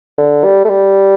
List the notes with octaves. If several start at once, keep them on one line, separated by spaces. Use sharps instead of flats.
D3
G3
A3
G3